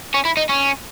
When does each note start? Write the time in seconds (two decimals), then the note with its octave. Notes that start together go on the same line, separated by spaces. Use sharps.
0.14 C#4
0.25 E4
0.37 D#4
0.49 C#4